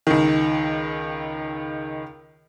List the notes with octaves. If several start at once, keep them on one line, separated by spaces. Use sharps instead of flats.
C#2 D#3